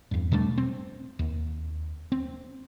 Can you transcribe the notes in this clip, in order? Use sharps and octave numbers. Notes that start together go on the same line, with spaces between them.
E2 G2
B2 G3 A3 D4
C4
D#2
C4